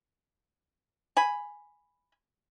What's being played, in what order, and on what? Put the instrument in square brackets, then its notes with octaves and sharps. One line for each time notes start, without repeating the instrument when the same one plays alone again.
[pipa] G#5 B5